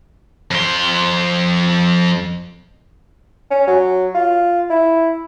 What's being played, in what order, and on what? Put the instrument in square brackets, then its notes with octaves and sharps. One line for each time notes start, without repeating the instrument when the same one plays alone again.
[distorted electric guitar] F2 C6
[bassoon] C#4
F#3
F4
E4